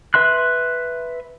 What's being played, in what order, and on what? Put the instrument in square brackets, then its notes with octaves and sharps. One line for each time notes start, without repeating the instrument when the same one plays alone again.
[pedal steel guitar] B4 E5 C6 F#6